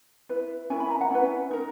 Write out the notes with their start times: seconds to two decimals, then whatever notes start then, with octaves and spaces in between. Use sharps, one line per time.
0.29 E4 B4
0.70 C#4 E4 A#4 G#5
0.80 B5
0.90 A#5
1.01 F#5
1.11 C#4 E4 B4
1.51 D#4 A#4